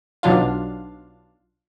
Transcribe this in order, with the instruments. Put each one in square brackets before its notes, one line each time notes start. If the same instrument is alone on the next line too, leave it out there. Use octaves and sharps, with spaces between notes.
[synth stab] B1 B2 F#3 D4 F4 F5